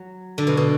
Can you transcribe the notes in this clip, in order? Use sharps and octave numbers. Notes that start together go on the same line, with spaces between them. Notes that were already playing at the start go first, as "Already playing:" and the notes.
Already playing: F#3
D3
B2
B2